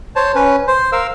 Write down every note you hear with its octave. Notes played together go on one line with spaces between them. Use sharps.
C5 C#5 A5
C#4 B4
C5
A#4 F5 E6